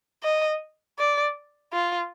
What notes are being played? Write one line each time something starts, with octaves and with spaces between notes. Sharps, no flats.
D#5
D5
F4